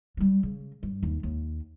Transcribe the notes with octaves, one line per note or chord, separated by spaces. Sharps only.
F#3 G3
C#3
G2
D#2
D#2